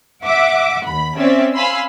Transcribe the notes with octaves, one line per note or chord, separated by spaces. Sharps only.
E5 F#5 D6
D#2 B5
C4 C#4 D5 E5
F5 G#5 B5 C6 E6